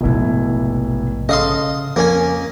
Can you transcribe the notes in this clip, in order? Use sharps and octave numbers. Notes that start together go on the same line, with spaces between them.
F1 A#1 G#2 B2 E4
C#3 A4 D#5 F5 C6 D#6
F2 A#3 C#4 G#5